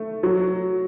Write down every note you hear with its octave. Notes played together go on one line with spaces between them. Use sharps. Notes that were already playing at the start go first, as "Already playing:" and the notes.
Already playing: A3
F#3